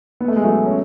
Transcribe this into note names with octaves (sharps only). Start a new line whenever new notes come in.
B3
A3
G#3
F#3 A3
C#4